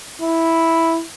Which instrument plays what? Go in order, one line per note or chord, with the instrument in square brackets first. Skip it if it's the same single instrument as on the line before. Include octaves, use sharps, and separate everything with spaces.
[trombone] E4